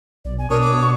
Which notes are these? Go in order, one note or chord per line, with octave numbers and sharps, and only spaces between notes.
B1 D5
G#5
B2 D4 A#4 C#5 D#6
D6
C#6